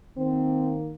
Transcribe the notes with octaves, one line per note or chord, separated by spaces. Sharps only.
D#3 A#3 C4